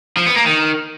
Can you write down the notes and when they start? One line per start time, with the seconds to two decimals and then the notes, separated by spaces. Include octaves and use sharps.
0.17 F3
0.26 B3
0.36 A#3
0.46 D#3